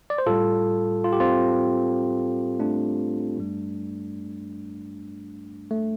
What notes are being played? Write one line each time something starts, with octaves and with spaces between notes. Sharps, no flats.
D5
C5
A2 G3 F4 A4
F4
G4
C4 F4
A3 D4
G2 G3
A3